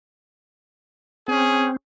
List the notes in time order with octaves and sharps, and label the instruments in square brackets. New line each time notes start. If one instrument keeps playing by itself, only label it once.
[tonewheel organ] C4 [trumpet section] C#4 G#4